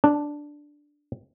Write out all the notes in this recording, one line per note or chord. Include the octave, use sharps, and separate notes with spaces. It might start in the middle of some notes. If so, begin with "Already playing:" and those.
D4